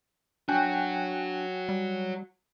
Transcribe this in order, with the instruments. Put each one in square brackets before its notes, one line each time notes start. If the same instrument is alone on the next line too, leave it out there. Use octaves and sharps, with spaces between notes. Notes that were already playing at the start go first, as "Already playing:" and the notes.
[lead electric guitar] F#3 F#4 [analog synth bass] D4 [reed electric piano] G5 G#5 F#6
[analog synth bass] G3